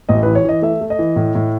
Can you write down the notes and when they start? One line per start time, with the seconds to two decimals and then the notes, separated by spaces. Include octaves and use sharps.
0.09 A1 D#5
0.23 E3 B4
0.35 C#5
0.44 E3 D#5
0.62 A3 E5
0.81 A3
0.90 D#5
0.99 E3
1.16 A2
1.35 A2